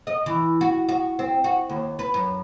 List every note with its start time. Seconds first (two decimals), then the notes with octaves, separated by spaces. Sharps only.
0.07 D#5
0.26 E3
0.61 F#4
0.89 F#4
1.19 C4
1.44 F#4
1.69 D#2
1.99 B4
2.14 F#2